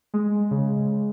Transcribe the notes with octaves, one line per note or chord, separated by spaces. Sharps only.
G#3
C#3